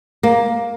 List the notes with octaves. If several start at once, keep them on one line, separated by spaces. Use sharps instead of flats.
A#3